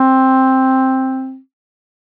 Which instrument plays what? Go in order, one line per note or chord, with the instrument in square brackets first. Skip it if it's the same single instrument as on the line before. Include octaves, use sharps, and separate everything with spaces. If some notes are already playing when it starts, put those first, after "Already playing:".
Already playing: [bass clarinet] C4